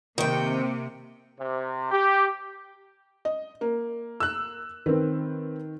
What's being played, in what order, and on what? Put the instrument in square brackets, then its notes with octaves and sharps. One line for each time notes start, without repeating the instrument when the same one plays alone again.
[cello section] C3 A#3 [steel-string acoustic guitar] D#3 G5
[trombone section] C3
G4
[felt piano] D#5
A#3
[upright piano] E6 F#6
[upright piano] D#3 [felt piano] C4 B4